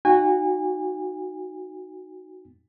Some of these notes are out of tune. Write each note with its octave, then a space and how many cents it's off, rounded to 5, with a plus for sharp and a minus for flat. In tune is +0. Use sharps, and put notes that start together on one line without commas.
D#4 +0 F#4 +0 G#5 -30